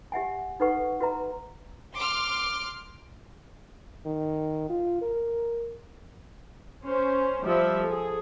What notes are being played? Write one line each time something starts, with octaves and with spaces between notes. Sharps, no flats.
G4 E5 F#5 G#5
D#4 A4 B4 F#5 C#6
F#4 B4 E5 A#5
C6 D6 F6
D#3
F4
A#4
C#4 C5
F3 G3 E5
G#4 A4